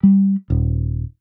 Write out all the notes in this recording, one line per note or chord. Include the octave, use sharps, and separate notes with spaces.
G3
D#1